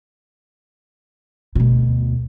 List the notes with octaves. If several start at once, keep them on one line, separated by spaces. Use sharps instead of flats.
D2 B2